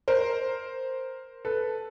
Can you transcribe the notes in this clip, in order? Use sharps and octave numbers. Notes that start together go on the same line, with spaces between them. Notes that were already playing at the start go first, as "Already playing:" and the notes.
A#4 C5
A4 B4